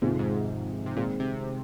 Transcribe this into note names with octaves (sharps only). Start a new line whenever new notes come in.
G#2 C3 D#3 G#3 F4
F2
G#2
C3
A#2 D#3 G#3 C4
C3